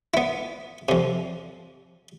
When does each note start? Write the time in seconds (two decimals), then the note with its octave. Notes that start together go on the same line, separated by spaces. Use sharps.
0.14 B3 E4
0.89 F2 C3